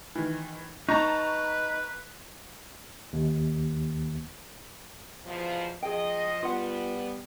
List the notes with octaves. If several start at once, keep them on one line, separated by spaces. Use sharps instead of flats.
D#3 E3
D#4 B4 A5 A#5 C#6
D#2
E2 B2 F3
F3 G#4 D#5 G5
G3 B3 F4 F#5